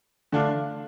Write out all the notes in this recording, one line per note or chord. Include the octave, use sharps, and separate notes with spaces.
D3 A3 D4 F4